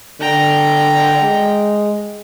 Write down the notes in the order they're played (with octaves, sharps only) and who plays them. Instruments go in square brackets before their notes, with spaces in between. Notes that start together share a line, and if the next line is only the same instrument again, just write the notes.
[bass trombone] D3 [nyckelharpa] G5 A#5
[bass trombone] G#3